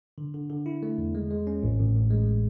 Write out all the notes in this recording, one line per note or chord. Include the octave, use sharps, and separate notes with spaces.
D3
D3
D3
E4
A3
E2
G#3
G#3
C#4
A1
A1
A1
G#3